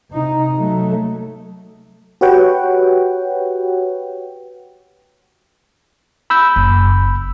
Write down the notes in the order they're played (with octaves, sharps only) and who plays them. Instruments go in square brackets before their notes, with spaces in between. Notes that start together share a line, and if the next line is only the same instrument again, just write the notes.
[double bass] C3 D#4
F#3 A3
[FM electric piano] F#4 G4 B4 C#5 F#5 G5
[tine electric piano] B5 E6 G6
[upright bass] F#1